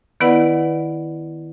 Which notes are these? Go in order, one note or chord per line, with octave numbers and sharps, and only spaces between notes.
D#3 B3 E4 B4 D5 F#5